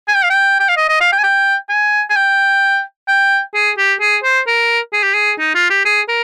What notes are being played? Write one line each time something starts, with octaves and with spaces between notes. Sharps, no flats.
G#5
G5
F5
G5
G5
F5
D#5
D#5
F5
G5
G#5
G5
G#5
G#5
G5
G5
G#4
G4
G#4
C5
A#4
G#4
G4
G#4
D#4
F4
G4
G#4
A#4